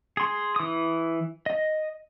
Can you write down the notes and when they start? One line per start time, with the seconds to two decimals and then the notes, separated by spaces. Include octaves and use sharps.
0.17 G#4 C6
0.56 E3 D#6
1.46 D#5